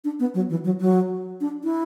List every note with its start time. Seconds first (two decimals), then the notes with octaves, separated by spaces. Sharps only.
0.04 D4
0.20 B3
0.34 F#3
0.50 E3
0.64 F#3
0.81 F#3
1.41 D4
1.64 E4